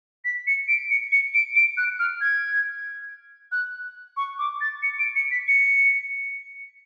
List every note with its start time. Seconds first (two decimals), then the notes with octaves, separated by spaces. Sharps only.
0.25 B6
0.47 C#7
0.68 D7
0.90 C#7
1.12 C#7
1.34 D7
1.56 D7
1.77 F#6
1.99 F6
2.21 G#6
3.52 F#6
4.17 C#6
4.39 D6
4.61 A6
4.83 C#7
4.99 D7
5.15 C#7
5.31 B6
5.48 C#7